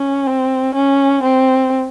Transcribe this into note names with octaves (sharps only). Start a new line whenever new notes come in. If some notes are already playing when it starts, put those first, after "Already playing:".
Already playing: C#4
C4
C#4
C4